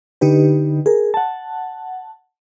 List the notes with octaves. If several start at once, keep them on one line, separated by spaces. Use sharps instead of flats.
D3 D#4 G4 B4
G#4 A#4
F#5 A5